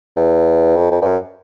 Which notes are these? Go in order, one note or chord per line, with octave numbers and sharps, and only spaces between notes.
E2
F2
F2
G2
F#2